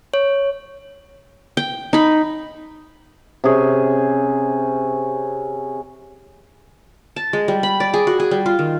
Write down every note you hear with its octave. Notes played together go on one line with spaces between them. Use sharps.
C#5
G5
D#4 B5
C3 C#4 G#4
A5
G#3
G3
B5
D5
G#4
F#4
G#4
G3
F4
D#3